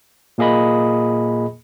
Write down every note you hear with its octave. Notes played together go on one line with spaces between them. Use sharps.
A#2 A#3 G#4 D#5 B5